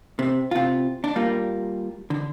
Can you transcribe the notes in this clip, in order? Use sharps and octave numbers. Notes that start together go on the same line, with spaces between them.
C3
C3 F4
D4
G3 A#3 F4
D3